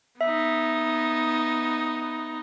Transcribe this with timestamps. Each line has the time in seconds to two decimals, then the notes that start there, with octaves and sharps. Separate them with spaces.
0.21 B3 D#4 E5